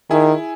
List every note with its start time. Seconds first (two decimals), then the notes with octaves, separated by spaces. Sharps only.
0.10 D#3 E4 G#4